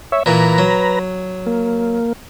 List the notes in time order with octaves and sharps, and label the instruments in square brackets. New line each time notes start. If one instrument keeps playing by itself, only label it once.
[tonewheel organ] C#5 E5
[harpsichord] A#2 E3 [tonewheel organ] B4 A#5
[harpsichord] F#3
[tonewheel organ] A#3